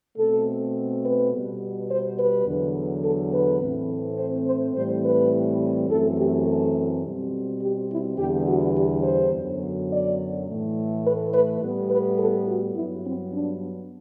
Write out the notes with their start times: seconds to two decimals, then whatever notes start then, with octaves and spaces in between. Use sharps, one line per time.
0.17 B2 A3 C4 A4
1.04 B4
1.32 B2 G3 B3
1.89 C5
2.17 B4
2.46 E2 D3 F#3
3.03 A4
3.31 B4
3.60 A2 E3 A3 C4
4.18 C5
4.46 C5
4.74 A2 E3 G3 C4 C5
5.04 B4
5.89 F#2 E3 A3 C4 A4
6.17 G4
6.46 A4
7.03 B2 G3 C4
7.61 G4
7.89 E4
8.17 E2 D3 G3 B3 G4
8.46 F#4
8.75 G4
9.03 C5
9.32 F#2 D3 F#3 B3
9.89 D5
10.46 A2 E3 A3
11.03 B4
11.32 B4
11.60 A2 G3 B3
11.89 B4
12.17 A4
12.46 F#4
12.75 G2 F#3 B3 E4
13.03 C4
13.32 D4